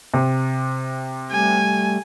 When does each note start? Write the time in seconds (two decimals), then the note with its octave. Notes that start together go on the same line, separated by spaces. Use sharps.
0.14 C3
1.31 G3 A3 G#5